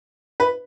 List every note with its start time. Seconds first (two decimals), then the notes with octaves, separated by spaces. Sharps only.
0.40 B4